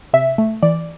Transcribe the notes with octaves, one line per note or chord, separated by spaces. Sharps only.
C3 E5
A3
E3 D5